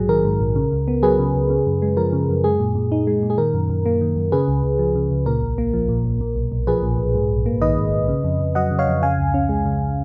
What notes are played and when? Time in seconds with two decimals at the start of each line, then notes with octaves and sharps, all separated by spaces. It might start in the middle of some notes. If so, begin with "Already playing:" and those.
Already playing: A#1 G#2 F#3 G#4
0.09 D#3 A#4
0.24 G#2
0.40 A#1
0.55 C#3
0.72 C#2
0.88 B3
1.03 F#3 G#4 B4
1.19 C#3
1.35 C#2
1.50 C#3
1.66 F#2
1.82 G#3
1.97 F3 A#4
2.13 C#3
2.28 F#2
2.44 G#3 G#4
2.60 A#2
2.75 A#2
2.92 D#4
3.07 G#3
3.23 A#2
3.30 G#4
3.38 D#3 A#4
3.54 F#2
3.69 F#2
3.86 A#3
4.01 D#3
4.16 F#2
4.32 C#3 G#4 B4
4.48 C#2
4.63 C#2
4.79 F3
4.95 C#3
5.11 C#2
5.26 A#2 A#4
5.42 A#1
5.58 A#3
5.74 F3
5.89 A#2
6.05 A#1
6.21 A#2
6.36 B1
6.52 B1
6.67 F3 G#4 B4
6.83 A#2
6.98 B1
7.15 G#2
7.30 A#1
7.46 A#3
7.61 D#3 B4 D#5
7.77 G#2
7.93 A#1
8.08 C#3
8.24 F2
8.40 F2
8.55 F#3 D#5 F#5
8.71 C#3
8.79 C#5 F5
8.87 F2
9.02 C#3 F5 G#5
9.18 C#2
9.34 C#4
9.49 G#3
9.65 C#3